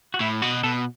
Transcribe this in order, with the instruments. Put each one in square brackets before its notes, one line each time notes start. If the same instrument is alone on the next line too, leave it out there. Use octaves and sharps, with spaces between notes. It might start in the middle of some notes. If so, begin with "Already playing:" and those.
[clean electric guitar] F#4
[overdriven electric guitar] A2 [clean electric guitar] E4
[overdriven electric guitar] B2 [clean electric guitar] F#4
[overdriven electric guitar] B2 [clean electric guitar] A4